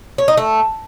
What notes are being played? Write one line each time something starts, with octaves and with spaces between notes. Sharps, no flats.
C#5
D#4
A3